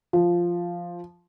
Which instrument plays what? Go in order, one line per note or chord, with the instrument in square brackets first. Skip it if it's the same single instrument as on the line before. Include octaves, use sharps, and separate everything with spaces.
[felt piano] F3